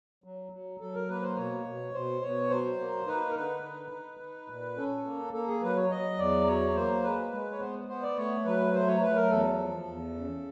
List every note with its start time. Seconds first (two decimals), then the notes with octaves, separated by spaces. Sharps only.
0.24 F#3
0.52 F#3
0.80 F#3 A4
0.95 A#4
1.09 A#3 B4
1.23 C5
1.37 B2 C#5
1.66 B2
1.94 B2 C5
2.22 B2 C#5
2.50 F#3 C5
2.79 A#3
3.07 D#4 B4
3.30 A#4
3.35 D3 B4
3.64 D#4
3.92 D#4
4.20 D#4
4.49 A#2
4.77 C#4 A4
5.05 A#3
5.34 A#3 A4
5.47 G#4
5.62 F#3 B4
5.76 C#5
5.90 F#3 D#5
6.18 E2 D5
6.47 F#3 C#5
6.75 A#3 C5
7.03 G#3 B4
7.32 G#3
7.51 C#5
7.60 B3 C5
7.88 B3 C5
8.03 D5
8.17 A3 C#5
8.45 F#3 B4
8.73 A3 C5
8.87 C#5
9.01 F#3 B4
9.16 A#4
9.30 E2 A4
9.58 F3
9.87 E2
10.15 C#3